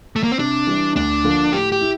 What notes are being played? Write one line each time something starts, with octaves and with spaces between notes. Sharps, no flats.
A3
A#3
C4
C3 D4
E3 G3
D2 D4
D3 F3 A#3
A2 G4
G4
E4